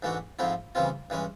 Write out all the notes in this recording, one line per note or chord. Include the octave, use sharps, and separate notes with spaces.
G#2 E3 A3 D4 F#4
G#2 F3 A3 C4 E4
C#3 E3 G3 C4 F4
G2 E3 G#3 C#4